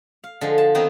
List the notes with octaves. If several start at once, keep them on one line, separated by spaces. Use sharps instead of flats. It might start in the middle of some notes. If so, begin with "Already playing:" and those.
F5
D3 F3 G#3
A5
D#3 B3 C4 A#5 C6